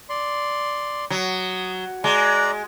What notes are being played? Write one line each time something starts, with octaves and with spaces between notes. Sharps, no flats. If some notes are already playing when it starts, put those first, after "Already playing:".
D5 C6
F#3 D#6
G#3 D5 A#5